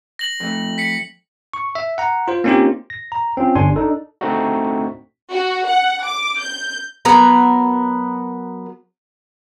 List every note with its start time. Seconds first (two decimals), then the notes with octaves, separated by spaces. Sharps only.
0.19 A#6 F#7
0.40 F2 A3
0.78 B6 C#7
1.53 C#6
1.75 E5
1.98 F#5 A#5
2.28 F4 C5
2.44 A#3 C4 C#4 D#4 F4 G4
2.90 A#6
3.12 A#5
3.37 C4 C#4 F4
3.56 G1 D4 G#5 C6
3.76 D4 D#4 A4
4.21 A3 C4 D4 D#4 F#4
5.30 F#4
5.66 F#5
6.03 D6
6.38 G6
7.05 F#3 B3 A#4 A#5